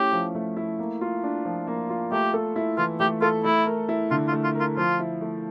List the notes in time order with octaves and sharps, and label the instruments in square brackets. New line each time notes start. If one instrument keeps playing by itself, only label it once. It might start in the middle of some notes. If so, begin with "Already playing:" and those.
Already playing: [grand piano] A3 C#4 E4 [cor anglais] G4
[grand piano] F3
A3
E4
A#3
F4
D4
F3
A#3
F4
[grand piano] A3 [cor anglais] G4
[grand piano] A4
E4
[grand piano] E3 [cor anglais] F4
[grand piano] A3 [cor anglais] G4
[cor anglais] F4 [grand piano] A4
[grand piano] A3 [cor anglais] E4
[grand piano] A#4
E4
[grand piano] D3 [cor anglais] F4
[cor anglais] F4
[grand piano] A3
[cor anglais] F4
[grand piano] A#4
[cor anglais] F4
[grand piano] F3 [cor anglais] F4
[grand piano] E4
A3